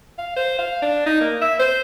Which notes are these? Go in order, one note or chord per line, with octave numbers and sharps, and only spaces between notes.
F5
C5
F5
D4
D#4
A#3
E5
C5